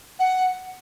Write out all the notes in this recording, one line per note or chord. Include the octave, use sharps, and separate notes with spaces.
F#5